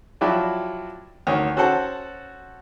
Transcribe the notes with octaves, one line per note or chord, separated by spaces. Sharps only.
F3 F#3 E4 F#4 G4 D5
D2 D#3 C#5
C#4 F#4 A4 C5 F#5 A5